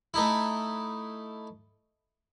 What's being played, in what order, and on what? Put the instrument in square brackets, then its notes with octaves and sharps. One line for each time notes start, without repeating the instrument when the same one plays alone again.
[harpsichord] A3 D#4 E4